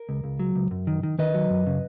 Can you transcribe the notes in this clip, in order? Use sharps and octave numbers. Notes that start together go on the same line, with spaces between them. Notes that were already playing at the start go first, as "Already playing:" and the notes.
Already playing: A#4
C#2
C#2
F#3
C#2
F#2
D#3
D#3
D#3 B4 D#5
F#3
F#2
C#3